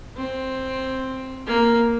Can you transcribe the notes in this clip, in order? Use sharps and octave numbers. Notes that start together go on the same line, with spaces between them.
C4
A#3